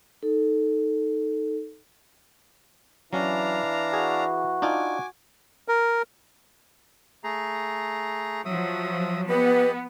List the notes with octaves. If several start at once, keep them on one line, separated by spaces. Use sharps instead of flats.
D#4 A4
E3 F#3 C#4 D4 F5 A#5
F#4 G#4
D4 D#4 F4 G#5 D6
A#4
A3 G#4 A#5
F3 F#3 E5 D#6
B3 G4 B4 D#5 B5